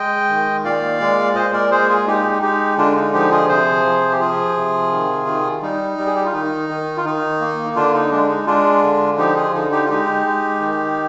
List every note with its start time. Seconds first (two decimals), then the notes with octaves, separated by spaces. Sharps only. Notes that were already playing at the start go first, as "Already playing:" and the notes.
Already playing: G#3 D#5 G5
0.29 D#3
0.64 A#2 D5 F5
1.00 G#3
1.35 A#2 C5 D#5
1.53 A#4 D5
1.71 G#3 G#4 C5
1.89 F4 G#4
2.07 G#3 D#4 G4
2.42 G#3 D#4 G4
2.77 D3 D4 F4
2.96 D#4
3.13 F3 D#4 G4
3.31 F4 G#4
3.48 C3 G#4 C5
3.85 F3
4.12 G4
4.20 F3 F4 G#4
4.56 C3
4.91 D#3
5.27 D#3
5.62 G3 D#4
5.98 G3
6.06 G#4
6.16 G4
6.25 F4
6.33 D#3 D#4
6.69 D#3
6.97 F4
7.05 D#3 D#4
7.41 A#3
7.76 D3 D4 F4
7.94 D#4
8.11 G#3 D4
8.29 D#4
8.46 G#3 D4 F4
8.83 D3
9.18 F3 D#4 G4
9.36 F4 G#4
9.53 D3 D#4
9.71 D#4 G4
9.85 F4
9.89 G#3 D#4 G4
10.26 G#3
10.60 D#3